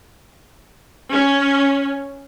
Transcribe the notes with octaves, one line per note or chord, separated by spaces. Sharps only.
C#4